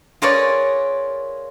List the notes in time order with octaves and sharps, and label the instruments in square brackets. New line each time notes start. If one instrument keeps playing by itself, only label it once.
[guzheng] F4 G#4 A#4 B4 C#5 D5